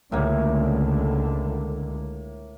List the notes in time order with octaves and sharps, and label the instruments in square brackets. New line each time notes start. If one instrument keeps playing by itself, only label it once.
[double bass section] C#2 D3 [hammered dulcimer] A2 A#3